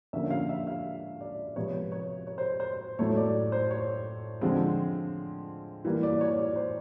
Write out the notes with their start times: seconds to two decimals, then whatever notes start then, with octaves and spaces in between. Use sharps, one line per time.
0.13 D3 F3 A#3 C#4 E5
0.30 F5
0.49 E5
0.67 F5
1.21 D5
1.56 C3 F3 G#3 B3 C#5
1.92 C#5
2.27 C#5
2.38 C5
2.60 C5
2.99 A2 F#3 A3 C#5
3.16 D5
3.52 C5
3.71 C#5
4.41 D3 F3 G#3 C4
5.85 E3 G3 A#3
6.03 D5
6.21 C#5
6.38 D5
6.56 C5